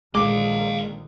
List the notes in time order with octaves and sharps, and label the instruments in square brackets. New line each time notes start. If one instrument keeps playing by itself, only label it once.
[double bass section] A#1 D3 D#3 [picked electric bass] G#3 [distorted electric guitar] D#5 F5 [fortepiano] D6